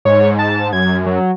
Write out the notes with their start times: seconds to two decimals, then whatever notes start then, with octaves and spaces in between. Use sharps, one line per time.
0.05 G#2 C#5
0.39 A5
0.73 F#2 G#6
1.06 F#3